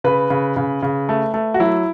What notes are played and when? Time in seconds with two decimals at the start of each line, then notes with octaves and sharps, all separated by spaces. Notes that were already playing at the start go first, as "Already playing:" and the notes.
0.04 C#3 B4
0.30 C#3
0.56 C#3
0.82 C#3
1.09 A3
1.34 A3
1.54 F#4
1.60 F#3 E4